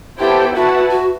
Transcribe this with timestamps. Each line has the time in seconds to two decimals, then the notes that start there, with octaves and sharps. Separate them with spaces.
0.19 B3 E4 G4 A4 C5 G5
0.55 E4 F#4 B4 F#5 A5
0.91 F#4